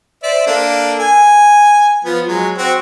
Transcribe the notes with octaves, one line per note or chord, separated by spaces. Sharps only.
C5 D5 E5
A#3 D4 A4
G#5
F3 B3
F#3 G#3
C4 F#4